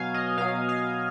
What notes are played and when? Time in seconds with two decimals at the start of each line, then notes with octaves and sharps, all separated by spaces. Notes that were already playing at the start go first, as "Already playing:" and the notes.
Already playing: B2 F#3 F5 G#5
0.14 D#5
0.37 B2 F#3 F5
0.69 F5